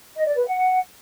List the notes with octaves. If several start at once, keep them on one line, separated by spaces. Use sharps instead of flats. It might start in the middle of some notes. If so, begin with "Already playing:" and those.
D#5
D5
B4
F#5